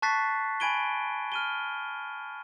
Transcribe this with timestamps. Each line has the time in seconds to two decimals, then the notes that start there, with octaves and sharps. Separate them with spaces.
0.02 A5 C#6 F#6 A6 B6 C7
0.60 G#5 B5 G#6 D7 D#7 G7
1.32 F6 D#7 G7